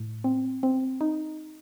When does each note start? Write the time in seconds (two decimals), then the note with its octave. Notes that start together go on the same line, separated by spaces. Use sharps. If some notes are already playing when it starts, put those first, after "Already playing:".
Already playing: A2
0.24 C4
0.63 C4
1.01 D#4